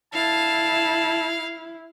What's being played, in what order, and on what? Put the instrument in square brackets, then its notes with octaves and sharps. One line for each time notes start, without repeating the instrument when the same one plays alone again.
[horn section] D3 A5 [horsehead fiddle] E4 [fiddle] F5